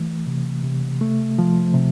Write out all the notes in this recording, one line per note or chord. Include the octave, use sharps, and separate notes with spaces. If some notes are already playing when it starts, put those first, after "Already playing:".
Already playing: E3 A3
C3
C3
A3
F3
C3